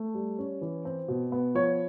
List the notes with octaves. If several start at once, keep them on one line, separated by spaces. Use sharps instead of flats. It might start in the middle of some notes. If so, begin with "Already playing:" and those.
Already playing: A3
G3
C#4
E3
C4
B2
B3
F3 C#5